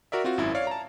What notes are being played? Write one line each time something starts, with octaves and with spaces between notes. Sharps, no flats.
F#4 A#4 D5 E5
C4 F4 F#4
G#1 F#2 E4
C#5 D5 F5
A5 A#5